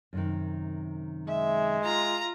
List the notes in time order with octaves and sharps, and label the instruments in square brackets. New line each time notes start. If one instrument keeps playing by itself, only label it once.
[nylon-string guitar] F#2 C3 D#3
[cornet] G#3 [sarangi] E5
[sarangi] F4 [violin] A#5